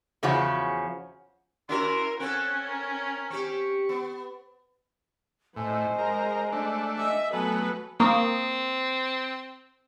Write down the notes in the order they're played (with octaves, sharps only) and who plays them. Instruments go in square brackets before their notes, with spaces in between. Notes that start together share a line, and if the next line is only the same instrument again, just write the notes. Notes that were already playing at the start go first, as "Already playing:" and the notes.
[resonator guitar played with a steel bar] E2 C#3 F3 C#4 F#4
[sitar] C#4 E4 F#4 [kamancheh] A#4 [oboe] C6
[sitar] C4 A4 [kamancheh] C#4 [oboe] F#5
[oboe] A#4
[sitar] C4 G4 [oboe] C#6
[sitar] B3
[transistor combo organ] A2 [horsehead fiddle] C5 D#5 [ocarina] G#5
[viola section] G#3 [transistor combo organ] A#4
[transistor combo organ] A3 D4
[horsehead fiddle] D#5 [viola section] E5 [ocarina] G#5
[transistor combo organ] F#3 B3 [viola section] A3 B4 [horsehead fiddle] A4 [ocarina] G#5
[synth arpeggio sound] A#3 [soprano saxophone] C4 [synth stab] A#5 C#6 D#6